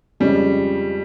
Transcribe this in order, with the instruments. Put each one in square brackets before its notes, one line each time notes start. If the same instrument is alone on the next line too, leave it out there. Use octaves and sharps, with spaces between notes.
[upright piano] F2 C#3 G#3 C#4 [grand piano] G3